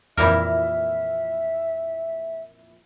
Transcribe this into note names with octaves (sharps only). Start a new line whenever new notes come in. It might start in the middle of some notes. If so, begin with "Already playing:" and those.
F2 A#2 E3 G3 E4 A#4 E5 F6